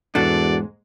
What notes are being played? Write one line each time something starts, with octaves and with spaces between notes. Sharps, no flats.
E2 G#2 G#3 D4 F#4 A4 D5